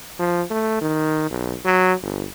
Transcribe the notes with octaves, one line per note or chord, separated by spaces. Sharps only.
F3
A3
D#3
B1
F#3
G1